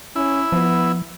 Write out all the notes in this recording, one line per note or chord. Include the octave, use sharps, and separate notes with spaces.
C#4 E4
F3 B3